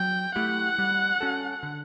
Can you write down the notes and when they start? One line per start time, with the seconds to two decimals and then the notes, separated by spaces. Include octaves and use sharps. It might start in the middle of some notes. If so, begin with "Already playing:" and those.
Already playing: F#3 G5
0.35 A3 E4 G4 F#5
0.78 G3
1.21 C#4 F#4 A4
1.63 D3